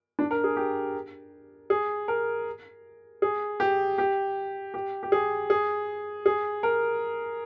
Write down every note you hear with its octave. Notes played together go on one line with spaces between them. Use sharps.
D4
A#4
G#4
G4
G#4
A#4
G#4
G4
G4
G4
G4
G#4
G#4
G#4
A#4